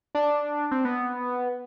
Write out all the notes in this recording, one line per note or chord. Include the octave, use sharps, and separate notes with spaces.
D4
C4
B3